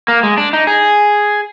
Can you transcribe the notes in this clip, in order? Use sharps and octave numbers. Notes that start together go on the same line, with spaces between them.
A#3
G#3
D4
D#4
G#4